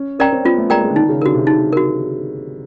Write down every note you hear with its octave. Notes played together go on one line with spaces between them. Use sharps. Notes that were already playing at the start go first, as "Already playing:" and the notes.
Already playing: C#4
C#4 A#4 D5 G5 A#5
C4
B3 F4
A3
G#3 A#4 D5 G5 A#5
G#3
D3
D#3 D#4
C#3
D3 F#4 A#4
C3
D#4
F#4 A#4